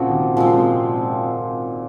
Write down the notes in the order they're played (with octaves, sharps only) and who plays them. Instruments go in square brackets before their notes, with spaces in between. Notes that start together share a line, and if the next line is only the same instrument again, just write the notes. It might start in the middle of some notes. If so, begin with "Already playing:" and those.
Already playing: [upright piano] A#2 C#3 [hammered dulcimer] F3 C4 F#4
[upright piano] C3 D#3
[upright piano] A#2 C#3 [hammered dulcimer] F3 G#3 C4
[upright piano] G#2 C3